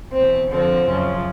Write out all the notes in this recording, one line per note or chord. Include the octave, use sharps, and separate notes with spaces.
E2 B2 C4
F2 D3 F3 C4
F#2 C#3 F3